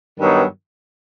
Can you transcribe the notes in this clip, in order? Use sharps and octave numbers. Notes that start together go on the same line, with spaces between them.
G2 D#3 F#3 B3 D#4